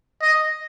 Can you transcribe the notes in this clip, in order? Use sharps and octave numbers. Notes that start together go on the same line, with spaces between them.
D#5